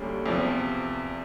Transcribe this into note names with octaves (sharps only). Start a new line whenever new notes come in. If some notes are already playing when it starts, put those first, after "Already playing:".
Already playing: D2 D3 G3 A#3 C#4
E2 C3 F3